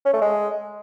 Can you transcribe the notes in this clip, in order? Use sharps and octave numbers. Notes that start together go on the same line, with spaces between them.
C#4
A3
G#3